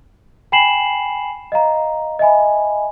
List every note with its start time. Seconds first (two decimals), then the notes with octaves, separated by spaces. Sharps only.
0.52 G5 G#5 B5 C7 E7 F#7
1.52 D#5 F5 A#5
2.19 D#5 E5 G#5 B5